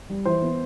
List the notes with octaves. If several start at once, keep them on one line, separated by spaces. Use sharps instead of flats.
G3
E3 C5
B3